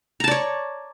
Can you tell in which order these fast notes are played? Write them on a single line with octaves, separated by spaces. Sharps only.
A#5 A5 D5 C#5